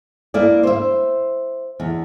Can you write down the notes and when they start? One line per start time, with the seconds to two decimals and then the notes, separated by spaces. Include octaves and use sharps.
0.34 A#3 E4 D5
0.63 C5 E5
1.80 E2